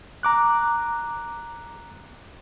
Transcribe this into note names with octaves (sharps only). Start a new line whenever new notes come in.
A#5 D6 F#6